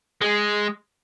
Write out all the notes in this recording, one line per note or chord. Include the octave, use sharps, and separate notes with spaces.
G#3